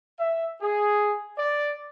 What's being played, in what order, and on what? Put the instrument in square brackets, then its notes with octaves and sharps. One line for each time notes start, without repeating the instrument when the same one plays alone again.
[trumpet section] E5
G#4
D5